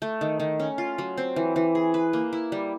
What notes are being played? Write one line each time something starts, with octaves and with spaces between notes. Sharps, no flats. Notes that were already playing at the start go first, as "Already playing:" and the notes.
A3
D#3
D#3
C#4
F4
F#3
C4
E3
E3
G#4
B4
A#3
E4
G3